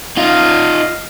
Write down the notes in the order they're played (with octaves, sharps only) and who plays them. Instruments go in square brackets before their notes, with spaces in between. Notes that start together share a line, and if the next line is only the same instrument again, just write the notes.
[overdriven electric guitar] D#4 F4 [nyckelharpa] D#5 F5